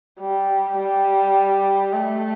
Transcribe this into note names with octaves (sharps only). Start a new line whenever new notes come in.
G3
G3
A3